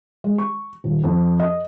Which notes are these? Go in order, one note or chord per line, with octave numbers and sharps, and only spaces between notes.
G#3
C#6
D#1
F2
D#5